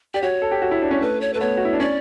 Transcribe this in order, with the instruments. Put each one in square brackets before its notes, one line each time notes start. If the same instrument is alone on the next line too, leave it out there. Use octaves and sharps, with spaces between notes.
[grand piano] G4 [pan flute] D5
[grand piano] F#4 [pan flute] C#5
[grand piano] A4
G4
F#4
E4
D4
C#4
[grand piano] A3 [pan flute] B4
[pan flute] C#5
[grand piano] A3 [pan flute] B4
[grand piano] B3 [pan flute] C#5
[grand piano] F#4
E4
D4
[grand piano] C#4 [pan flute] D5